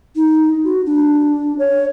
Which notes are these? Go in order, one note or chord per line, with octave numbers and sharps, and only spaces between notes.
D#4
F#4
D4
C#5